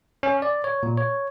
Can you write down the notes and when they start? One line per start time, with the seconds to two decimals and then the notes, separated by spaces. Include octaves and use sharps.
0.23 C#4
0.42 D5
0.64 C#5
0.83 A#2
0.97 C#5